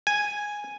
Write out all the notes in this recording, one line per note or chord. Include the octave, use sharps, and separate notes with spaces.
G#5